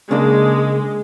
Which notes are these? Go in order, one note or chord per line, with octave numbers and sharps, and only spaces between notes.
C#3 G#3 A#3 D4